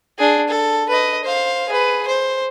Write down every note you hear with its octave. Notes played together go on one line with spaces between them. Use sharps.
D4 G#4
A4
B4 D#5
C5 F5
G#4 B4
C5